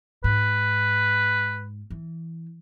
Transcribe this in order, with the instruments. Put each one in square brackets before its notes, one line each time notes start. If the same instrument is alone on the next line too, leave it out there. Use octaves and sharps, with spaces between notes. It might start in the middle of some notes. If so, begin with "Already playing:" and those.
[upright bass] G#2 [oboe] B4
[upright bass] E3